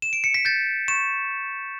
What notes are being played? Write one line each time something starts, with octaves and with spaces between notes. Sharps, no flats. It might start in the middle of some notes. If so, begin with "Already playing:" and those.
E7
D7
C#7
B6
G6 A6
C#6 E7